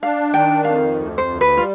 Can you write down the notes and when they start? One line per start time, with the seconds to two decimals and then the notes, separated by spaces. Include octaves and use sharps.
0.03 D4 F5
0.34 D#3 G5
0.64 F2 F5
0.95 D2
1.18 C5
1.26 D2
1.41 B4
1.56 G3 F4